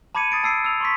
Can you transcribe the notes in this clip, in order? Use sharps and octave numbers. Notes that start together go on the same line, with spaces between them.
A5 B5 D6 G#6 C#7 D#7
D#6 A6 C7 D7
A5 E6 C7 D7
E6 F7
C6 C#6 B6